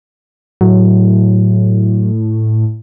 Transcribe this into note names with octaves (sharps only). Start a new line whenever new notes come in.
A2 F#3